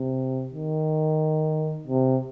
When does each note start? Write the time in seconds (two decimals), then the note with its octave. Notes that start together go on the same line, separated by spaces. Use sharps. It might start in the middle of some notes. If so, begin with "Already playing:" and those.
Already playing: C3
0.54 D#3
1.87 C3